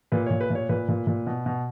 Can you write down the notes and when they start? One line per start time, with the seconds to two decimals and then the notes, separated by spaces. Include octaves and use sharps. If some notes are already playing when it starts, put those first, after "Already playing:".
0.12 A#2 B4
0.26 A#2 C#5
0.41 B4
0.50 A#2
0.55 C#5
0.69 A#2 B4
0.89 A#2
1.07 A#2
1.27 B2
1.46 B2